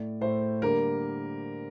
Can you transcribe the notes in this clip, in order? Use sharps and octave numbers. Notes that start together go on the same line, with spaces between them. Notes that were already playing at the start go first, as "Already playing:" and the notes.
Already playing: A2 A3 D5
A2 A3 C5
D3 G3 A#3 A#4